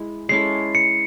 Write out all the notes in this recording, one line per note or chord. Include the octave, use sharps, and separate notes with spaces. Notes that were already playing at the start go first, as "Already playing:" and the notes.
Already playing: G#3 E4
G#3 C#4 E4 A4 C7
C#7